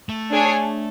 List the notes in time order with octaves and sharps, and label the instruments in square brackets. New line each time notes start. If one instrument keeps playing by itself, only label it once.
[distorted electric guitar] A3
[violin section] D4 G#4 C#5 G#5